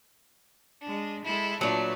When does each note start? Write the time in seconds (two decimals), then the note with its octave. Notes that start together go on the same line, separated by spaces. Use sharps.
0.82 G#3 D4
1.24 G#3 E4 A4
1.61 A#2 F#3 A3 D4 B4